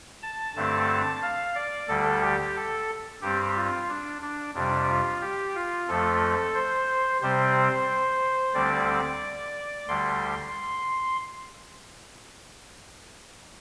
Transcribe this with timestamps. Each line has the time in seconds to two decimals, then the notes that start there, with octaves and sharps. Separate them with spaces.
0.22 A5
0.56 G2 D3 A3 C4 A5
1.22 F5
1.55 D5
1.88 D2 D3 G3 A4
2.22 G4
2.56 A4
3.22 G2 G3 C4 G4
3.55 F4
3.89 D4
4.22 D4
4.54 F2 C3 G3 D4
4.89 F4
5.22 G4
5.55 F4
5.88 F2 F3 A3 A4
6.54 C5
7.21 C3 G3 C4 C5
8.54 D2 D3 G3 C4 D5
9.87 D2 D3 G3 C6